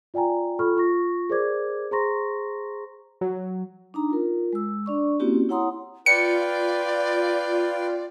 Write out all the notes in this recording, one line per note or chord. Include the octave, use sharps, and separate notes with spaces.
F4 D5 G5 G#5 A#5
F4 A4 B5 C#6 F6
F4 C#6 A#6
G#4 A#4 C5 D5 D6 G#6
G#4 C5 A#5 C6 C#6 A#6
F#3
D4 D#4 A#5
F4 A#4
G#3 E6
D4 D5 C#6
A#3 C4 C#4 E4 F#4 G4
E4 C#5 F#5 A#5 C6 D#6
F4 B4 D5 G5 C#7